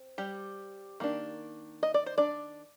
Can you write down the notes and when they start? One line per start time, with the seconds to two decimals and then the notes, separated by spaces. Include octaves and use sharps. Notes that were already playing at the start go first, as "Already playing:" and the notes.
Already playing: C4
0.18 G3 G4
1.00 D#3 A#3 D4
1.83 D#5
1.94 D5
2.06 C5
2.18 D4 D5